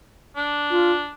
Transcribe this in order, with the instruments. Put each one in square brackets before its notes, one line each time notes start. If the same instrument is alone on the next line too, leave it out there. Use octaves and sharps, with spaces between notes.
[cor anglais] D4
[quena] F4